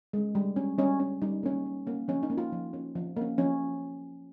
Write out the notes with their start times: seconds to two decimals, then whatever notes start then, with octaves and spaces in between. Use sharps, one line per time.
0.13 G#3 C#4
0.35 G3
0.56 C#4
0.78 G3 C#4
1.00 C#4
1.22 G3 D#4
1.43 A#3 C#4
1.66 G3
1.87 A#3 C#4
2.08 F3 C#4
2.23 D#4
2.30 A#3 C#4
2.38 F4
2.52 F3
2.73 A#3 C#4
2.95 F3
3.16 A#3
3.21 C#4
3.38 F3 C#4